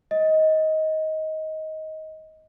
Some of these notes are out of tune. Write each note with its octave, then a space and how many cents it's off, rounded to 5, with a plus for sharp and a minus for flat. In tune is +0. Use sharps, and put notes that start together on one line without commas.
D#5 +15